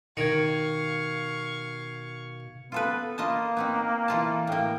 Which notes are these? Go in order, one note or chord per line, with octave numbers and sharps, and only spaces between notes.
B2 D#3 F5 C#6 G#6 C#7
B3 F4 A4 B4
A#3 F4 D#5 A5
B3 C4 D#4
E3 F4 A5
A2 A#3 G5